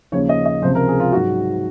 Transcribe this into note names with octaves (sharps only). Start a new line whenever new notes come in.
D#2 C#3 F3 C#5
D#5
D#5
C#2 C3 F3 C5
A#4
G#4
F4
G#2 F#3 F#4